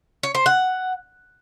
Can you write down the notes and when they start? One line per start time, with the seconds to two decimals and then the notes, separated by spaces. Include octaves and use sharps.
0.23 C#5
0.35 C5
0.46 F#5